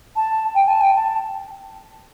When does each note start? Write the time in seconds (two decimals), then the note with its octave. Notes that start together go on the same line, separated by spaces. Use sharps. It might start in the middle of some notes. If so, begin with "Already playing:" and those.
0.15 A5
0.54 G5
0.67 A5
0.80 G5
0.95 A5